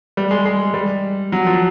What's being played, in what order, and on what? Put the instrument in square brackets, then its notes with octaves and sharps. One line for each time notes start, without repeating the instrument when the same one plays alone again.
[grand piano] G3
G#3
G#3
G3
F#3
F3